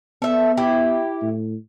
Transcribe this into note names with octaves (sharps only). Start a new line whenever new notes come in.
B3 A4 E5
E4 G4
A2